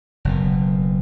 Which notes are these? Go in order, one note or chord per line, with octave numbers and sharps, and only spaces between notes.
F#1 F#2 B2